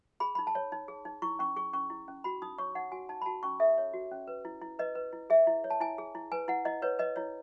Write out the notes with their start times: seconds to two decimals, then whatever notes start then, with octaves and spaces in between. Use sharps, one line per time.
0.20 G#4 B5
0.35 D#4 B5
0.47 A5
0.55 C#5
0.72 D#4
0.88 G#4
1.05 D#4
1.22 E4 C#6
1.39 C#4 C#6
1.56 G#4 C#6
1.73 C#4 C#6
1.90 E4
2.08 C#4
2.24 F#4 B5
2.42 D#4 D#6
2.58 C#5 C#6
2.75 D#4 F#5
2.92 F#4 G#5
3.09 D#4 A5
3.21 B5
3.26 F#4 A5
3.43 C#4 C#6
3.60 A4 E5
3.78 C#5
3.94 F#4
4.11 C#4
4.27 B4
4.45 E4
4.62 E4
4.79 B4 D#5
4.95 B4
5.13 E4
5.30 G#4 E5
5.47 E4
5.64 C#5
5.70 A5
5.81 E4 G#5
5.98 G#4
6.15 E4
6.32 B4 G#5
6.48 E4 F#5
6.65 E4 D#5
6.82 B4 C#5
6.99 B4 D#5
7.16 E4 C#5